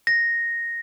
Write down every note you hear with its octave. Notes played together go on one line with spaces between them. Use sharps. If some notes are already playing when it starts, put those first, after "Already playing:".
A#6